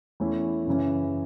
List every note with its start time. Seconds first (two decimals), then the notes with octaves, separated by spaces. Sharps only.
0.20 E2 E3 A3 C#4 E4
0.67 F#2 C#3 E3 C#4